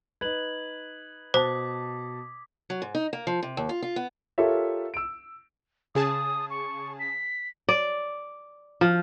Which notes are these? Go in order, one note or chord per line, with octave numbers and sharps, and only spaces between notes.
D#4 B4 G#6 F#7
B2 C5 A5 D6 D#6 B6
F#3
G#2
D#4
A#3
F3
C3
D#2
F4
F4
B3
F4 G4 A4 A#4 C#5 E5
E6 D7
C#3 G#4 A5 D#6
C#6
B6
D5
F3